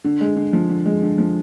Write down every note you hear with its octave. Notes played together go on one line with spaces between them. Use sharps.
D3
G#3
D3
F3
D3
G#3
D3
F3